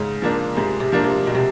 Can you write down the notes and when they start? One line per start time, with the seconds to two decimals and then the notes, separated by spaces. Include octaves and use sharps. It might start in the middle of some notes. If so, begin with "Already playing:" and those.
Already playing: G#2 C#3
0.22 F3 A#3 D4
0.57 G#2 C3
0.80 C3
0.92 F3 A#3 D4
1.04 C3
1.27 B2
1.35 C3